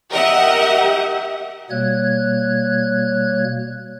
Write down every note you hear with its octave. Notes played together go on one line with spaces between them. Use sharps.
G4 A#4 D#5 E5 F#5
B2 G3 A#3 C#5 F#6 G#6